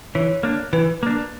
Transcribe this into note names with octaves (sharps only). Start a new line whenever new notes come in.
E3 C#5
A#3 D4
E3 B4
A#3 D4